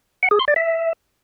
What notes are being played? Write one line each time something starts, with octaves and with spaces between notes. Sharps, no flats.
F#5
G#4
C6
D5
E5